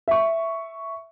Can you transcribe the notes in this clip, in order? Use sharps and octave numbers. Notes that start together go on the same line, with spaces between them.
E5 C#6